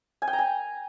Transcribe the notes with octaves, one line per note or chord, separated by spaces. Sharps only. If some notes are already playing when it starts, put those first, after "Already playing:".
G#5
G5
A#5
G#5